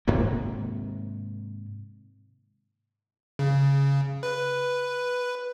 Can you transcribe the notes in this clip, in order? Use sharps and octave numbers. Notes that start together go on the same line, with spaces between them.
G#2 C3 D#3 A#3
C#3
B4